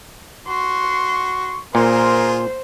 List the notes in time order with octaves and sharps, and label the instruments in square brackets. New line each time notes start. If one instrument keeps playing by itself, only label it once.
[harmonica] F#4 [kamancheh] C6 [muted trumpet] C#6
[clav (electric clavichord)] A#2 [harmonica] F4 G#4 C6 [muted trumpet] A#4 [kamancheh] C5